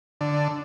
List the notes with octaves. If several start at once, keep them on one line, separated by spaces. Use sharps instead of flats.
D3